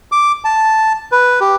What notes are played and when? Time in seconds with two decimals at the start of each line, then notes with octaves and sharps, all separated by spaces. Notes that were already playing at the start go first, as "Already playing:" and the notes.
0.12 D6
0.45 A5
1.12 B4
1.41 G4